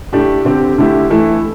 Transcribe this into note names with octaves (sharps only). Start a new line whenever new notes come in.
A2 A3 D4 G4
D3 C4 G4
D3 A3 E4 G4
E3 A3 E4